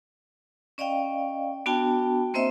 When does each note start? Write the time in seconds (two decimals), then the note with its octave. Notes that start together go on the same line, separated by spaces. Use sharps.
0.78 C#4 D5 D#5 F5 G5
1.66 B3 D4 F#4 G5 A5
2.34 A#3 C4 C5 D#5 E5